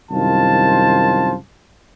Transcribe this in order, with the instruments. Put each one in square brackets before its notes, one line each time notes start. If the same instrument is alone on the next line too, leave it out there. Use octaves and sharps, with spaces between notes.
[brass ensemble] C2 F#2 D#3 F4 C5 A5